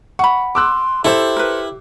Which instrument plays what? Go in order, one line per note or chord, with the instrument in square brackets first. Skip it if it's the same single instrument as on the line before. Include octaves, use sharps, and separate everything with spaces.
[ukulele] F#5 B5 [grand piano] C#6
[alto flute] C6 [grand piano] D6 E6 F#6
[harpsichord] E4 [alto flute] G4 [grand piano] A4 C5
[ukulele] A#4 B4